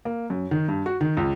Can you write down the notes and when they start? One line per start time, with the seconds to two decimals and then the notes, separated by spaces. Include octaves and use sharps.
0.05 A#3
0.30 F#2
0.51 D#3
0.68 G2
0.86 F#4
1.01 D#3
1.17 C#2